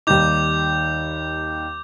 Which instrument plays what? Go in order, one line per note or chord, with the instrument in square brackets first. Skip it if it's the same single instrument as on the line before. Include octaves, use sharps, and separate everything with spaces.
[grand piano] D#2 G3 D#4 [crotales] D6 G6